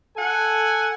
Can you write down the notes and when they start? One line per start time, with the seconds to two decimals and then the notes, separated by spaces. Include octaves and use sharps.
0.17 A4 F#5 G#5